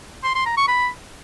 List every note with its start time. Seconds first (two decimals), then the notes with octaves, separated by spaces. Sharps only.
0.24 C6
0.35 C6
0.46 A#5
0.57 C#6
0.68 B5